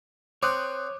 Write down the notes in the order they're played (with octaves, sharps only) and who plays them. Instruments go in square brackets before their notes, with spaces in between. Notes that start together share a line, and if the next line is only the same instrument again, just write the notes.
[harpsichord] C4 [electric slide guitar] C#5 [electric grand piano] D6 D#6 F#6